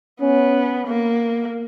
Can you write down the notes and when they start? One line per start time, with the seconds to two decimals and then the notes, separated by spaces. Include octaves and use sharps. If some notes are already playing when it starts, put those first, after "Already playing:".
0.21 B3 C#4
0.87 A#3